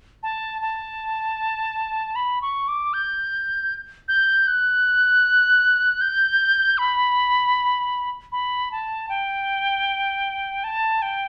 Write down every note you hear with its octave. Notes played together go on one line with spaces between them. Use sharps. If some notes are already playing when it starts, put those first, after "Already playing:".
A5
A5
B5
C#6
D6
G6
G6
F#6
G6
B5
B5
A5
G5
A5
G5